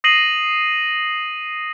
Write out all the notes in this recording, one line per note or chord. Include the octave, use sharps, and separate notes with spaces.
D#6 A#6 C7 D#7 F#7